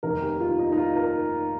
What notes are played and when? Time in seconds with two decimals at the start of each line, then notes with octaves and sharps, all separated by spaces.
0.03 F1 D#2 D#3 A#4
0.22 G4
0.40 F4
0.59 D#4
0.72 D#4
0.78 F4
0.96 A#4